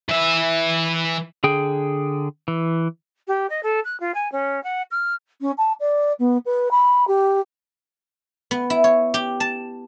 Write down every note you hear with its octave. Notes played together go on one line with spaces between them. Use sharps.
E3 E5
D3 G#4 G5
E3
G4
D#5
A4
F#6
F4
G#5
C#4
F#5
F6
C#4
A5
D5
B3
B4
B5
G4
B3
E4
C#5
G4
A5